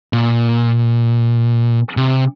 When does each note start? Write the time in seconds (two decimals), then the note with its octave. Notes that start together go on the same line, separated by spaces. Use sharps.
0.13 A#2
1.97 C3